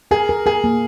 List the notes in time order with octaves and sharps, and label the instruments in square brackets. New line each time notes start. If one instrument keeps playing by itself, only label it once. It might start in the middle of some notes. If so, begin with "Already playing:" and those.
[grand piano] G#4 [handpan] A#4
[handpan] A#4
[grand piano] G#4 [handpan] A#4
[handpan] A#3